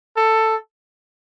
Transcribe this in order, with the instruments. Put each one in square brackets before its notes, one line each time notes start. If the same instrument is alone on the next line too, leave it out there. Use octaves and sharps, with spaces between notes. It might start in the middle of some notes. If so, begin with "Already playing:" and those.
[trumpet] A4